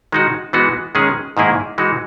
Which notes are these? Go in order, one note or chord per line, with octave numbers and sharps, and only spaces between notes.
D#3 G#3 D#4 F#4
E3 G#3 B3 D#4 F#4
D#3 G#3 C#4 G#4
G#2 D#3 A#3 E4 G#4
E3 G#3 D#4 F#4